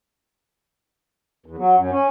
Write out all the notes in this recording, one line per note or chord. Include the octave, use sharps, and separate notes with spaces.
E2
F#3
F#2
C#4